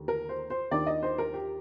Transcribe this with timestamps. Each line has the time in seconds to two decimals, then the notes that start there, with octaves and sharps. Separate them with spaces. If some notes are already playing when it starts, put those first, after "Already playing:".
Already playing: D#2 D3 A3
0.08 A#4
0.29 C5
0.50 C5
0.71 D#2 D#3 A#3 D4 D5
0.87 D#5
1.03 C5
1.18 A#4
1.34 G4